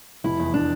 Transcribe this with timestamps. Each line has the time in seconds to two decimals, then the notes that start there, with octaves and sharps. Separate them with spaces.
0.24 F1 E4
0.40 E2
0.54 D4